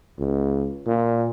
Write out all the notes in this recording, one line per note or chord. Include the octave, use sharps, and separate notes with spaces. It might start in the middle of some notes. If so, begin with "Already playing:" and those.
C#2
A#2